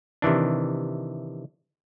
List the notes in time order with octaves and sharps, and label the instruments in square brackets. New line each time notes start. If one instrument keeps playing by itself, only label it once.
[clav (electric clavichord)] C3 D#3 E3 D4